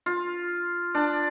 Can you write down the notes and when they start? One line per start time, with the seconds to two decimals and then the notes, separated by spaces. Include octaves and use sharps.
0.06 F4
0.94 D4